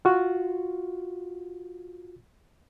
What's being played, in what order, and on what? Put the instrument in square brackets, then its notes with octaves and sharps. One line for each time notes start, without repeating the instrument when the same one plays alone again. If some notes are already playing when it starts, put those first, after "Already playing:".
[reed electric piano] F4 F#4